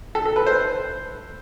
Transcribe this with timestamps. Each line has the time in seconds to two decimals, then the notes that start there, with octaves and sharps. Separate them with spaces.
0.15 A4
0.26 A4
0.36 B4
0.47 C5